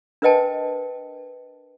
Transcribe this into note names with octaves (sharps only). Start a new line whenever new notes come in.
D4 A#4 B4 D#5 G5 A5